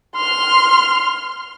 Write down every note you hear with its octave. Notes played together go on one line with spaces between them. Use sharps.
C6 F6